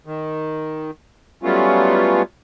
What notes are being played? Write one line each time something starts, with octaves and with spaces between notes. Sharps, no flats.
D#3
F#3 G3 A3 B3 C#4 F4